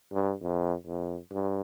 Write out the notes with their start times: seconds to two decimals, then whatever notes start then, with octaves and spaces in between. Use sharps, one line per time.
0.13 G2
0.42 F2
0.87 F2
1.32 G2